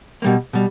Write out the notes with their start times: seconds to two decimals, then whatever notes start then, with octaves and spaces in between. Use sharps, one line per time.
0.22 B2 G3 A#3
0.53 B2 G3